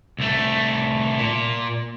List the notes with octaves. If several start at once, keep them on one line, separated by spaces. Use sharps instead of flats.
C2 A3
A#2